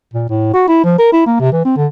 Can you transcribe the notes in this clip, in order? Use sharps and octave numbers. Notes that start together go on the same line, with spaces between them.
A#2
A2
F#4
E4
F3
A#4
E4
A#3
C3
E3
C4
D3